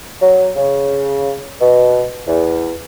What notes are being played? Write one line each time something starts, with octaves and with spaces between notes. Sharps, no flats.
F#3
C#3
B2
E2